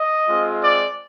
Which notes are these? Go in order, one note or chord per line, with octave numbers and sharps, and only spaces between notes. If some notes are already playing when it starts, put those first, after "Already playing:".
Already playing: D#5
G#3 C4 F4
D5